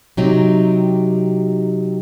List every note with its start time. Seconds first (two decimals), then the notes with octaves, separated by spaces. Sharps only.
0.17 C3 F#3 C4 D#4 G4